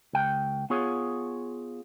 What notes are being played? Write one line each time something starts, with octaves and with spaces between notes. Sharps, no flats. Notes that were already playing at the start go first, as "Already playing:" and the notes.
C#2 G5
B3 F4 G#4 C#5